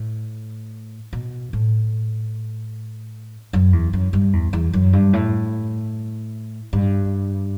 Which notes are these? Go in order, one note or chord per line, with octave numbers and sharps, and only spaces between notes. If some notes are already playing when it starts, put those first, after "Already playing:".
Already playing: A2
B2
A2
F#2
E2
F#2
G2
E2
E2
F#2
G2
A2
G2